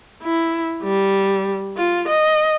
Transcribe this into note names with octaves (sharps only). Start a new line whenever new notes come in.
E4
G3
F4
D#5